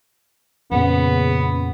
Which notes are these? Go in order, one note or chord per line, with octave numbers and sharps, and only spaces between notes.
F2 A#2 C#3 B3